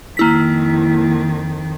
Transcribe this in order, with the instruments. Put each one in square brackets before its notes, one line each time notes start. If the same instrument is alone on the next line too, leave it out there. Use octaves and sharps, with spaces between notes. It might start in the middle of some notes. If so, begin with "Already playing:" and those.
[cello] F2 D#3 [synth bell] A#3 E4 B6